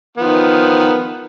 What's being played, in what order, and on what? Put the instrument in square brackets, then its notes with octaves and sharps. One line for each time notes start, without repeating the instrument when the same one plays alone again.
[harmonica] D#3 F3 B3